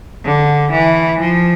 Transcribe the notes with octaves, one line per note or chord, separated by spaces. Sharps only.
D3
E3
F3